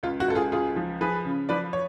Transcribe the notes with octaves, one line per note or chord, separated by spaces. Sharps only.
C#2 F4
F#4
C#2 A4
F4 G#4
C#2 F4 G#4
F3
F3 G#4 B4
C#3
F3 B4 D5
C#5